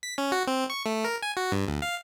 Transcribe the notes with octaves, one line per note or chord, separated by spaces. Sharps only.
B6
C#4
F#4
C4
C#6
A3
A#4
G#5
F#4
G2
D2
F5